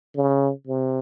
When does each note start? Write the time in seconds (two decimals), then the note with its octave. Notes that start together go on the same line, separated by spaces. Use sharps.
0.15 C#3
0.67 C3